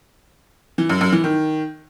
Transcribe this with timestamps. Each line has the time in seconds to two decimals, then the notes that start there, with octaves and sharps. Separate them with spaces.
0.78 E3
0.89 F#2
1.01 F#2
1.12 E3
1.24 D#3